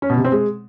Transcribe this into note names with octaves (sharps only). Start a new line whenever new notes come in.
C#4
B2
C3
C4
G#3